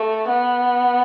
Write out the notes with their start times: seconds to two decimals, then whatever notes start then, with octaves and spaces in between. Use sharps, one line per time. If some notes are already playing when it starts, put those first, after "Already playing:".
Already playing: A3
0.29 B3